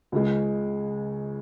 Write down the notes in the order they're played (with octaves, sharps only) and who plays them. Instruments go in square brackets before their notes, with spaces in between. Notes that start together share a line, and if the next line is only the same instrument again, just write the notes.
[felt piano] C#2 C#3 G#3